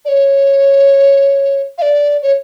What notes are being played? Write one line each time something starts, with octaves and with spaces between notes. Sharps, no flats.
D5
C#5
F5
D5
C#5